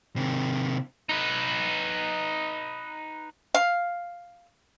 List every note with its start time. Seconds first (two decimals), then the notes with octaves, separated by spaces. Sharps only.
0.16 C3 D#3
1.09 D#4 B4
3.55 F5